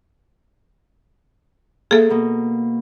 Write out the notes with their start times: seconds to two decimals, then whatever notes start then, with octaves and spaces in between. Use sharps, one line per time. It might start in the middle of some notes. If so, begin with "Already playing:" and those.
1.91 A#3 G#4 A4 E5
2.10 B2 A#3